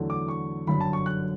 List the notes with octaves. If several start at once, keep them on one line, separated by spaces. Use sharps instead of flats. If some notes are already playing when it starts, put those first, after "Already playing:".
Already playing: E2 D3 F#3 A3
D6
C#6
G1 F#2 D3 B5
A5
C#6
F#6